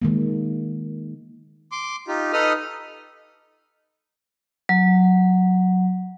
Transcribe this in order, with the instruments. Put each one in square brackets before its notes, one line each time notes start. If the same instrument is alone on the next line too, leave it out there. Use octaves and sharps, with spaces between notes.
[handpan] D#3 G#3 A#3
[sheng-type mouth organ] C6 D6
D#4 F4 G4
D#4 A4 B4 D#5 D#6 F6
[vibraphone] F#3